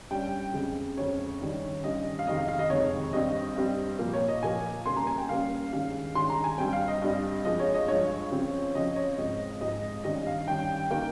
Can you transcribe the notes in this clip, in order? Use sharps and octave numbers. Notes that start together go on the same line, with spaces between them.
G2 G3 C#4 G5
F2 C#3 G#3 C4
F2 C#3 G#3 C4 C#5
G2 D#3 G3 C#4
G2 D#3 G3 C#4 D#5
F5
F2 C3 D#3 G#3 D#5
F5
F5
D#5
F2 C3 D#3 G#3 C#5
G2 G3 C4 D#5
G2 G3 C4
A#2 F3 A#3
C#5
D#5
A#2 F3 A#3 G#5
C#3 G3 A#3 C#4 C6
A#5
G#5
G5
C#3 G3 A#3 C#4 F5
G2 D#3 G#3 C#4 F5
G2 D#3 G#3 C#4 C6
A#5
G#5
G2 G3 C4 G5
F5
D#5
G2 G3 C4
G2 F3 G#3 D#5
C#5
D#5
G2 F3 G#3 C#5
C#3 F3 C4
C#3 F3 C4 D#5
C#5
G#2 F3 G#3 C4 D#5
G#2 F3 G#3 C4 D#5
G2 D#3 G3 C#4 D#5
F5
G2 D#3 G3 C#4 G5
D#3 A#3 G5